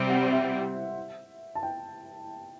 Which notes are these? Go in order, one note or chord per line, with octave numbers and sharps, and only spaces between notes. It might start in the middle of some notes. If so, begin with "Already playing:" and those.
Already playing: C3 G3 C4 C5 E5
F#5
E5
A5
G5